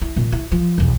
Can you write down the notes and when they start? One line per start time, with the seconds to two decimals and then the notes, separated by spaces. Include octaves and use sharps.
0.01 E4
0.16 A#2 D#3
0.32 E4
0.52 F3
0.78 B1 E2